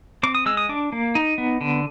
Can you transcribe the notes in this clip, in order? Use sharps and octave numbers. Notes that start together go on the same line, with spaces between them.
C4 D6
D#6
G#3 E6
D#6
D4 D6
A#3
D#4
B3
D3